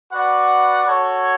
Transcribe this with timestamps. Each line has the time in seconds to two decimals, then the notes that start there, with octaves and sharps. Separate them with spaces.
0.11 F#4 B4 D5 F#5
0.86 F#4 A4 C#5